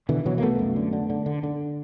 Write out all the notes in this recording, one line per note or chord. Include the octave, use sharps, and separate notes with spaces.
B2 D3 E3
B2 E3 F#3
A#3
C2 A3 B3
F#2
D3
D3
D3
D3
D3